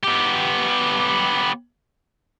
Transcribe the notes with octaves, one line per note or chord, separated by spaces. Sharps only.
B3 G4